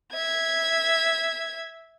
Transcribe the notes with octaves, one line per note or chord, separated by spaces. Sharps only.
E5 G#6